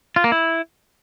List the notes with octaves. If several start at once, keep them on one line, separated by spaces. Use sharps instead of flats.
F4
A#3
E4